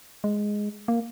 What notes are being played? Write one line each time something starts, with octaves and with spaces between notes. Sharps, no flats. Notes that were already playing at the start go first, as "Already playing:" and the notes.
G#3
A#3